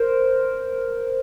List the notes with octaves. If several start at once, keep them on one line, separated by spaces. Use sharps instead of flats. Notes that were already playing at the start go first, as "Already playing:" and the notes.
Already playing: A#4 C5